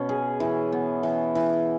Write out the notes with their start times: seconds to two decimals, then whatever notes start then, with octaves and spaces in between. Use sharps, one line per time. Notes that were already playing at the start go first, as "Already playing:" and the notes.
Already playing: B2 C#4
0.09 G#4
0.40 E3
0.72 B3
1.03 E3
1.35 E3